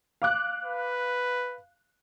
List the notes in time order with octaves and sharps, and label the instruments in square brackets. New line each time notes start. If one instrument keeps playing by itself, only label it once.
[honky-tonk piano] F5 D6 F#6
[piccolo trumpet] B4